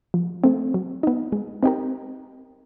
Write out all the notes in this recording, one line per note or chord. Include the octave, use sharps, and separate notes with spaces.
F3
A3 C4
F#3
B3 D#4
G#3
C4 D#4 G4 A#4